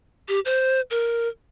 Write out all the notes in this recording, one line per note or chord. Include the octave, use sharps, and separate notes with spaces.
G4
C5
A#4